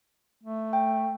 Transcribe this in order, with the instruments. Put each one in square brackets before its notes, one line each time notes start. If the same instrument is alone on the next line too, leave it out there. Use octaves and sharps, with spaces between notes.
[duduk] A3
[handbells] G5